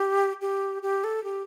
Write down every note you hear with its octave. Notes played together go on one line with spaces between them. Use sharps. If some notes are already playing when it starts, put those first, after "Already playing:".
Already playing: G4
G4
G4
A4
G4